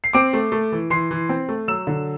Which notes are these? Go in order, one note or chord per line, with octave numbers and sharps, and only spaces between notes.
C7
C4 D6 D7
A3
A3
E3
E3 C6 C7
E3
C4
A3
F#3 E6 E7
D3